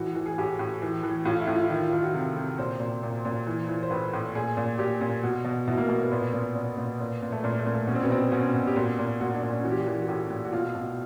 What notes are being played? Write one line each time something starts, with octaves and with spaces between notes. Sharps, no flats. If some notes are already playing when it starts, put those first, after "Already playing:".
Already playing: A2 E3 F#4
E3
G#4
A2 G4
A2
E3
E3
A2 F4
E4
A2
F4
D#3 E4
F4
D#3 F4
F#4
C3
C3
A#2 C5
A#2
A#2
A#2
E3
E3
C5
A2 B4
A2
A#2 G#4
A#2
A#2 G4
A#2
B2 F#4
B2
B2 E4
A#3
B2 A#3
B3
A#2 B3
A#2
A#2
A#2
A#2
A#2
A3
A#2 A#3
A3
A#2
A3
B2 C#4
C4
B3
B2 C4
B2 C#4
B2
G4
A#2 F#4
A#2
A#2 F#4
D4
A#2
C#4
E3 F#4
G4
F#4
E3
F#4
A2 G4
A2
F#4
B2 F4
B2